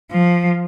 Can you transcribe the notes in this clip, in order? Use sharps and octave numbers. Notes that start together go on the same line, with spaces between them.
F3